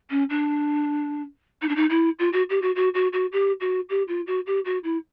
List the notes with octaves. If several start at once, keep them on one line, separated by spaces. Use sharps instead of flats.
C#4
D4
D#4
D4
D#4
E4
F4
F#4
G4
F#4
F#4
F#4
F#4
G4
F#4
G4
F4
F#4
G4
F#4
E4